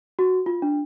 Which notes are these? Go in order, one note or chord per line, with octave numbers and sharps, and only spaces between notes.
F#4
F4
D4